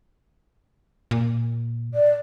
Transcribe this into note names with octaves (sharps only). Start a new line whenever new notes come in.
A#2
D5